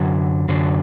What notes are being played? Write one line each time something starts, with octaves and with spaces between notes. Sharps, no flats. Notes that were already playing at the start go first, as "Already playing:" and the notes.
Already playing: F#2 D3 F#3
F#2 D3 F#3